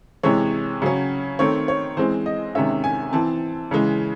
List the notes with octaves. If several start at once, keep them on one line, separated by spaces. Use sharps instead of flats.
C3 E3 G#3 C#5
C#3 F#3 C#4
D#3 A3 C4 C#5
C#5
E3 G#3 C4 C5
D#5
C3 D#3 G#3 C#4 E5
G#5
E3 C4 A5
C#3 E3 G#3